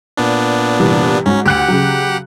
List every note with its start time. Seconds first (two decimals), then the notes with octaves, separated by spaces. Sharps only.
0.17 A#2 B3 D4
0.80 G2 C3 E3
1.26 G#2 C#4 F#4
1.45 D2 G4 F#5 F#6 C#7
1.68 C#3 F#3